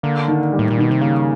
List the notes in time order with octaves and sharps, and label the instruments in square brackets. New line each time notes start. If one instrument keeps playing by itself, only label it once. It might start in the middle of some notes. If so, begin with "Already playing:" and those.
[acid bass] D3 [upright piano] A#3
[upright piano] D#3
G3
[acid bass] A2
A#2
[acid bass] B2 [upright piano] D#3
[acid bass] C3
[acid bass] C#3 [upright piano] A#3